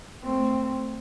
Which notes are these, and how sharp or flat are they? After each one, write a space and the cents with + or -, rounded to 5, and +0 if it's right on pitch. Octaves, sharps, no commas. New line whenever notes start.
A3 +15 C4 +0